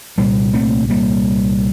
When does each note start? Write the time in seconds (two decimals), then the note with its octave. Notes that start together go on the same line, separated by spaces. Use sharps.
0.18 C2 A#2 G3 A#3
0.54 A3 C4
0.90 G3 A#3